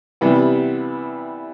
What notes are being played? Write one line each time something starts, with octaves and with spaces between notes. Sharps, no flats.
C3 E3 G3 B3